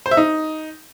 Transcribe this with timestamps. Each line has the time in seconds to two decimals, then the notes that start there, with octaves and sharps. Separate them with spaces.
0.06 C5
0.11 E5
0.17 D#4